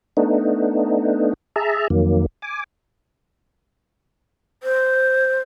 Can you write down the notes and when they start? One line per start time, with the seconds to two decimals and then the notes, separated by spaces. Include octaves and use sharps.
0.17 A3 B3 D4 D#4
1.56 G#4 E5 A5 A#5
1.90 F2 D#3 F#3 A#3
2.42 G#5 D6
4.63 C5